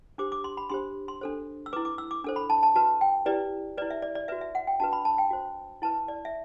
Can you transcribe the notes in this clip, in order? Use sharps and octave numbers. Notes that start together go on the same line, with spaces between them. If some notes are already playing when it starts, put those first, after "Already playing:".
D4 G4 C5 D6
D6
C6
B5
D4 G4 C5 C6
C6
D4 A4 C5
E6
E4 B4 D6
D6
E6
D6
D4 A4 C5
B5
A5
A5
F#4 B4 A5
G5
E4 G4 B4 D5
E4 B4 D5
E5
D5
D5
F#4 B4 E5
E5
F#5
G5
D4 F#4 B4 A5
B5
A5
G5
F#4 C5
E4 B4 A5
D5
E5